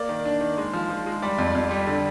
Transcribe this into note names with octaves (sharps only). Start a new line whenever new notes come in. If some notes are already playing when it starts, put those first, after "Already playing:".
Already playing: A#3 D5
D#3
D4
D#3
G#3
F3
F3
G#3
G3 D5
F2
F2
G3
D3